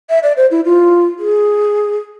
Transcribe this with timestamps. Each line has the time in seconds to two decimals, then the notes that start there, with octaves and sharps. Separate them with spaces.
0.10 E5
0.23 D5
0.37 C5
0.51 E4
0.65 F4
1.19 G#4